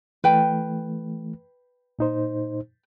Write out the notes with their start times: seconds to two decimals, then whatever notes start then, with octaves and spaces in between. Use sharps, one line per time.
0.24 E3 A3 B4 G5
1.99 A#2 D#4 C5